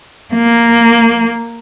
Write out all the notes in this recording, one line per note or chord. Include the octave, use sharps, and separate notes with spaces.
A#3